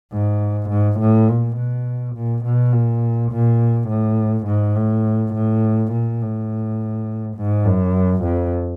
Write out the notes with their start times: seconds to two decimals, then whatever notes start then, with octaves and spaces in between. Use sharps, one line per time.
0.12 G#2
0.69 G#2
0.99 A2
1.28 A#2
1.56 B2
2.15 A#2
2.44 B2
2.72 A#2
3.31 A#2
3.88 A2
4.46 G#2
4.76 A2
5.34 A2
5.92 A#2
6.21 A2
7.37 G#2
7.65 F#2
8.24 F2